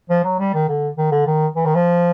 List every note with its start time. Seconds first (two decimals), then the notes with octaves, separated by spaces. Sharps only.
0.10 F3
0.25 F#3
0.40 G3
0.54 D#3
0.69 D3
0.98 D#3
1.12 D3
1.27 D#3
1.56 E3
1.66 D#3
1.75 F3